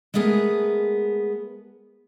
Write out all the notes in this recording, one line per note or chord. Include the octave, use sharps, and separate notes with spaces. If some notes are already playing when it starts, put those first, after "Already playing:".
G#3 A3 B3 G#4 A#4